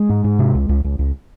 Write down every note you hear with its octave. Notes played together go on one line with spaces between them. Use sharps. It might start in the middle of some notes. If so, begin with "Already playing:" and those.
Already playing: G#3
G#2
G#2
C3
C#2
C#2
C#2
C#2